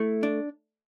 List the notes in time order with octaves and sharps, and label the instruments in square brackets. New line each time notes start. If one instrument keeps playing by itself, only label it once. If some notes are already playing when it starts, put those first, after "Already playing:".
Already playing: [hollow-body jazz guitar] A3 E4
D4